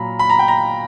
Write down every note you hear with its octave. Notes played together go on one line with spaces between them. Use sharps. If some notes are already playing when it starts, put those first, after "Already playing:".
Already playing: A#2 F#3 A#5 B5
B5
A#5
G5
A#5